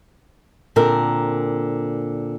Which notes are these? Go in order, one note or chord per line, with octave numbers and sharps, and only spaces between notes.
A#2 D3 C4 A#4